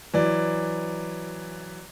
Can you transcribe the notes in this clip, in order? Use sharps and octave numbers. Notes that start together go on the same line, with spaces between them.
E3 F#3 D5